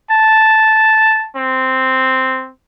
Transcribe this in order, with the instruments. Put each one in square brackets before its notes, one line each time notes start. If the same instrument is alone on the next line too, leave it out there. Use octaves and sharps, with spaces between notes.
[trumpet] A5
C4